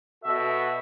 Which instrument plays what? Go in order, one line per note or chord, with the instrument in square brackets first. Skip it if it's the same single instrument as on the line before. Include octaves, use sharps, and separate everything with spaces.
[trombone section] B2 F#4 A4 [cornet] E5